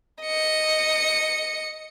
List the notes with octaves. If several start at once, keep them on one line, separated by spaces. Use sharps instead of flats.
D#5 C#7